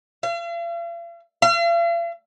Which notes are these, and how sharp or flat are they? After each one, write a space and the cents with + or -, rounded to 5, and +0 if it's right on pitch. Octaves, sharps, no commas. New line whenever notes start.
F5 -45
F5 -45